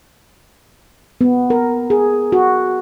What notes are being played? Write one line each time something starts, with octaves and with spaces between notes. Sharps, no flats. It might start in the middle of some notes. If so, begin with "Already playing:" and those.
B3
A#4
G#4
F#4